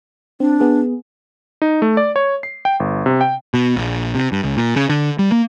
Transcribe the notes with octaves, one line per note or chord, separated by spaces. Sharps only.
C4 D4
B3 G#4
D#4
A3
D5
C#5
C7
G5
G1
C3
G5
B2
A#1
C3
G2
C#2
A#2
C#3
D3
G3
A#3